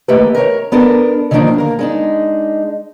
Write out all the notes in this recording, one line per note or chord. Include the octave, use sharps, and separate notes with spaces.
D#3 A3 A#3 G4 B4
A#4 C#5
B3 D4 A4 A#4
D3 D#3 F3 A#3 D4 D#4
A#3 A#4
G#3 D4 D#4